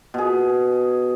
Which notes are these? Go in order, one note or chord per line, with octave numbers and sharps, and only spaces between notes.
B2 G#4